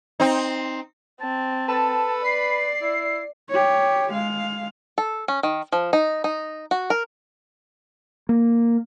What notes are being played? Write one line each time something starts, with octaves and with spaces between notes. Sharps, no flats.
C4 D#4
C4 A5
A4 B4 A5
D5 B5 C7
E4
G4 C#5
G#3 F5
A4
C#4
D#3
F3
D#4
D#4
F#4
A#4
A#3